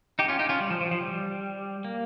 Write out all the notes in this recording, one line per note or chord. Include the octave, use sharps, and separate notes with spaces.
D#4 G4
C#4 F4
D#4 G4
C#4 F4
G3
F3
F3
F3
G3
A#3